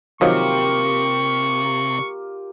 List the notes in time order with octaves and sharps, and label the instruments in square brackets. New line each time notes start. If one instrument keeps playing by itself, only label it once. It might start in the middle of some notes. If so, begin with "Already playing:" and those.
[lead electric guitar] C3 [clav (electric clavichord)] D#3 F3 F#3 [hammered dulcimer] A#3 F4 G4 [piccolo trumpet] C#6